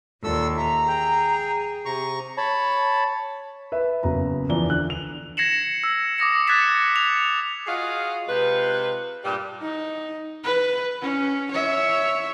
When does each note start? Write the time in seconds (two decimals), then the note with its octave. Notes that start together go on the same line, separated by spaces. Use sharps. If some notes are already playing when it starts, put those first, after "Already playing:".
0.24 D#2 A#2 A4 E6
0.57 E5 A#5
0.88 G#4 G5
1.85 C3 A#5 C#6
2.37 C#5 A5 B5
3.72 B4 E5
4.03 F#1 F#3 B3 A#5
4.49 E2 E3 F3 D5 A#5 G7
4.68 D3 F#6
4.90 F7
5.37 G#6 A#6 C7 C#7 E7 F#7
5.84 E6
6.18 D6 D#6 A#6 C#7
6.47 F#6 G#6 A6 B6 C#7 E7
6.96 F7
7.67 F4 F#4 G#4 D#5 F5
8.28 C3 G#3 F4 B4
9.24 G2 A#2 G3
9.62 D#4
10.44 B4
11.02 C#4
11.51 C#5 E5